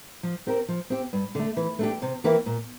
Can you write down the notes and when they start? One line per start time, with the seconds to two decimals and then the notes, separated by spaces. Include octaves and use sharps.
0.23 F3
0.47 C4 G4 A#4
0.68 F3
0.90 C4 G4
1.13 G2
1.35 D3 A3
1.57 E3
1.79 A3 D4 G4
2.02 C3
2.24 E3 A#3 E4 G4
2.46 A#2